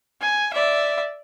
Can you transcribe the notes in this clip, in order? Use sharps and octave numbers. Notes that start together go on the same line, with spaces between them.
G#5
D5 E5